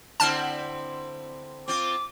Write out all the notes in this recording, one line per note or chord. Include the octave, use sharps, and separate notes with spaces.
D3 C4 E4 A5 F6
C4 F4 D6